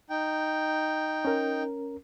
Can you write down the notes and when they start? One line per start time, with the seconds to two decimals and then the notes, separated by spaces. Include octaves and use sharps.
0.10 D#4 G5
1.25 C#4 A#4